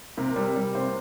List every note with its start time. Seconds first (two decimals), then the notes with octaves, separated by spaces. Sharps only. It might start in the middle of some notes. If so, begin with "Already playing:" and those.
0.17 C3 A#4
0.36 G3
0.56 G3
0.75 C3 C5